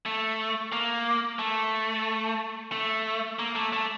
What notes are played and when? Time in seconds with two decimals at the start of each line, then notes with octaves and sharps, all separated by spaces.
0.06 A3
0.72 A#3
1.39 A3
2.72 A3
3.39 A#3
3.56 A3
3.73 A3